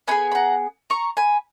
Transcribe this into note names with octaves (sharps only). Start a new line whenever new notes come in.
B3 D#4 G#4 G#5 B5
B5
F#5 A#5
A#5 C#6
G#5 B5